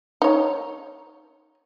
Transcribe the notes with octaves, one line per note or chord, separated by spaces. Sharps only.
D#4 C#5